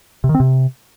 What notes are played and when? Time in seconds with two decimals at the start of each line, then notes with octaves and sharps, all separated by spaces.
0.24 C3
0.29 D#3
0.35 C4
0.40 C3